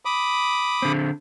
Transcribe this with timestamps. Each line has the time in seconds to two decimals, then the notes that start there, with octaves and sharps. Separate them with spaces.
0.05 B5 D6 D#6
0.82 D3 C4